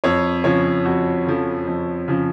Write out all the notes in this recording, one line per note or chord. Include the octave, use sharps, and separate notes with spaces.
F2 C#5
C#3 F3 C#5
F2 F#4
C#3 F3 A4
F2
C#3 F3